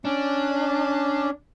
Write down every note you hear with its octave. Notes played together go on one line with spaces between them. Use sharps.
C#4 D4